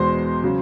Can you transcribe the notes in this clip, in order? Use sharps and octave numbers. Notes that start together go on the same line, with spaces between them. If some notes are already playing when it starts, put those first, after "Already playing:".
Already playing: E2 B2 G#3 C5 C6
C#3 F#3